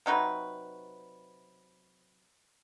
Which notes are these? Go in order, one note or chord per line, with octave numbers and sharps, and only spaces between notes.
C3 F#3 D#4 B4